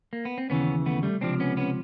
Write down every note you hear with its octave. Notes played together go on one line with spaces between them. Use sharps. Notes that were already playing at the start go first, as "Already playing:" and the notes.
A#3
B3
C4
D#2 C#3 E3 B3 C#4
A3 B3
G3 A3
C#2 C3 F3 C4 D4
B3 C#4
B3 C#4